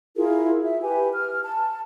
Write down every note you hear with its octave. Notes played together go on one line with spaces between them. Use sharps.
E4 F4 G#4 A#4
E4 E5
G4 B4 G#5
F6
A5